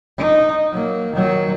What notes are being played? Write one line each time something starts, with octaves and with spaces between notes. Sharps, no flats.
D#4
F#3 A#3
D#3 F#3